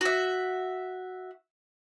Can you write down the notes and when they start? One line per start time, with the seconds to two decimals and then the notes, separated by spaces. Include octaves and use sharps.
0.01 F#4 E5